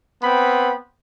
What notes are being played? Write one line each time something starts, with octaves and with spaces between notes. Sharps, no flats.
B3 C4 B5